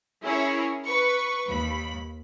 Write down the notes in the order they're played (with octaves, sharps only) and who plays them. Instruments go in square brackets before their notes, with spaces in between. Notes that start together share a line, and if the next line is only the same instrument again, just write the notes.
[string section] C#4 E4 G#4 A#4 C#5
B4 C#6
D#2 B5